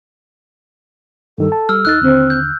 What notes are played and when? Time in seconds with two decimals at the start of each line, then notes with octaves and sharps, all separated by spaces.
1.38 G2 D#3 G3 A4
1.52 A5
1.69 G3 E6 F6
1.85 D#2 D#4 E6 F#6 A6
2.02 D#2 D3 C4
2.30 G6